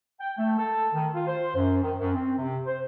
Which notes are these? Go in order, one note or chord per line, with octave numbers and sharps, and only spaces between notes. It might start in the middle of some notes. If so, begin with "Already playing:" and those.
G5
A3
A4
D#3
F4
C5
F#2
D#3
F#2
C4
C3
C5